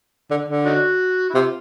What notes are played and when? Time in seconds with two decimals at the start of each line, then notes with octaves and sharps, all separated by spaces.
0.31 D3
0.48 D3
0.66 C#4 D#4 F#4
1.30 E4
1.34 C3 F4